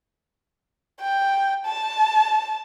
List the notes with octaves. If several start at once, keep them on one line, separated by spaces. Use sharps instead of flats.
G5
A5